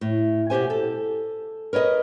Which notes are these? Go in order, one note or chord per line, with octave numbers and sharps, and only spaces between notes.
A2
B2 F#4 G4 C5 G#5
A4
A#4 B4 C#5 D#5